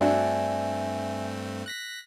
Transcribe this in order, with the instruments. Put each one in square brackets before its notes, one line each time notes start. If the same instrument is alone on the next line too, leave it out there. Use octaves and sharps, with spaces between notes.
[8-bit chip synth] G2 A3 C4 [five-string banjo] D4 F#4 [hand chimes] E5 G#5
[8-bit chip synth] F#6 A#6 B6